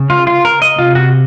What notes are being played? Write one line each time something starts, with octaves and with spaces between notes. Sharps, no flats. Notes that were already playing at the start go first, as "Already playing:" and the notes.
Already playing: C#3
F4
F4
A#4
D#5
C3 F4
F#4